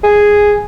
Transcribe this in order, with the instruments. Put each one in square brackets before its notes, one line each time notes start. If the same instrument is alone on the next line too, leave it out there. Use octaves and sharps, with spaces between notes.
[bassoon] G#4